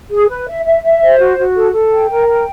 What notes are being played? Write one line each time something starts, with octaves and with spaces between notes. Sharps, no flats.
G#4
B4
E5
E5
E5
C5
F#4
F#4
A4
A4
G5
A#4
G5